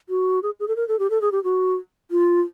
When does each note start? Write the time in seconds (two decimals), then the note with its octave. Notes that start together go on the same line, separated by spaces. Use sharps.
0.09 F#4
0.43 G#4
0.60 G#4
0.68 A4
0.76 A#4
0.88 A4
0.99 G4
1.10 A4
1.22 G#4
1.32 G4
1.44 F#4
2.11 F4